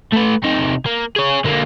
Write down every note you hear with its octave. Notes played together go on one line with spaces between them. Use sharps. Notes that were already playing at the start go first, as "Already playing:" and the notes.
A3 B4
C3 D#4
A#3
G#4 C#5
D3 A#3